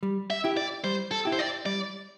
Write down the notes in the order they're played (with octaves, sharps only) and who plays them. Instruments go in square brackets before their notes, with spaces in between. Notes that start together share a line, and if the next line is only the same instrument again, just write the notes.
[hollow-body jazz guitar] G3
[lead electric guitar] E5
[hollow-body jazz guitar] E4 G4
[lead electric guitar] D5
[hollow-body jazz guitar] G3 [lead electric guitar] C5
[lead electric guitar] A4
[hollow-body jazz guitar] E4 G4
[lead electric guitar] C5
D5
[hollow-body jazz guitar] G3 [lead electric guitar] D5